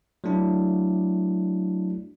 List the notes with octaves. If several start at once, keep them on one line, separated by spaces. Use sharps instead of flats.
F#3 A3 D4 E4